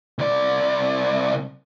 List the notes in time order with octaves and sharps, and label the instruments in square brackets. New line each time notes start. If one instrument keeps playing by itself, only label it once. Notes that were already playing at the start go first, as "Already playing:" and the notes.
[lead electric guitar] C2 D5